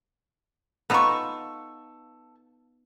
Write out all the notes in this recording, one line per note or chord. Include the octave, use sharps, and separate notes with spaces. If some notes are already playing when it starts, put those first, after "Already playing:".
B3 D#4 F4 A4 C#6